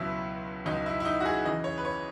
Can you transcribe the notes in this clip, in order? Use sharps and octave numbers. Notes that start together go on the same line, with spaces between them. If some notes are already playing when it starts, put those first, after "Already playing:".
Already playing: C#2 B2 F#3 E4
C#2 B2 F#3 D#4
E4
E4
D#4
F#4
G#4
E2 C#3 E3 D#5
C#5
B4
C#5